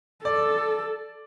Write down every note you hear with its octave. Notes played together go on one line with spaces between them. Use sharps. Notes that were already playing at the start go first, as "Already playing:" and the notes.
A4 D5